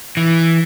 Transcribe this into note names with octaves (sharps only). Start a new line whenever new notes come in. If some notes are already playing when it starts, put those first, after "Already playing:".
E3